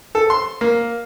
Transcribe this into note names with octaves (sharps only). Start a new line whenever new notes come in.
A4
C6
A#3